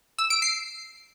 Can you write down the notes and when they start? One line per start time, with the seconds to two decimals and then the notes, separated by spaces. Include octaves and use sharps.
0.18 E6
0.30 D7
0.42 C7